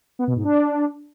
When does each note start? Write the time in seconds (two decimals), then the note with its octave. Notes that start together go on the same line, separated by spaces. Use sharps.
0.19 B3
0.27 B2
0.36 G#2
0.45 D4